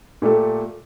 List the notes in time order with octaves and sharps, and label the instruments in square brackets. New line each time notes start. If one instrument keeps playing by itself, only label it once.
[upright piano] A#2 A3 G4 A4